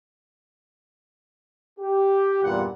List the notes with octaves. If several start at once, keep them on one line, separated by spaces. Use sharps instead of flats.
G4
E2 G2 A#2 G3 F4 F#5